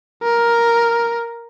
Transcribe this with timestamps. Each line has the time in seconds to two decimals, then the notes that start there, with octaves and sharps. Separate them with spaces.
0.23 A#4